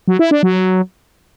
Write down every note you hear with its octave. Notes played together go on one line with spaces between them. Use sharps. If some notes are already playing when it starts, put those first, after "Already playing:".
F#3
E4
D4
F#3